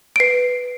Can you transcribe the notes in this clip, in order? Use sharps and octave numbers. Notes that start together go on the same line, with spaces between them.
D7
B4 C7